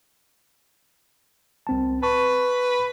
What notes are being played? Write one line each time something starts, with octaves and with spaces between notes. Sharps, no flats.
C2 C4 A5
B4 A5 C#6